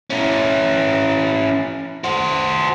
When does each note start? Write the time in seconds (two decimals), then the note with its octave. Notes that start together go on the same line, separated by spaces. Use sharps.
0.10 C#4 E4
2.04 F#4 C5